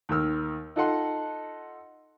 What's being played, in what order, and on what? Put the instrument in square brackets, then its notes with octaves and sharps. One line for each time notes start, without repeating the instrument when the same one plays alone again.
[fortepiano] D#2 D#3 A#4 E6 F6
D#4 F4 A4 D#5 F#5 C6